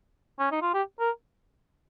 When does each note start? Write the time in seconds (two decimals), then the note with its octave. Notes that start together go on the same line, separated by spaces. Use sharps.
0.39 C#4
0.52 D#4
0.62 F4
0.74 G4
0.99 A#4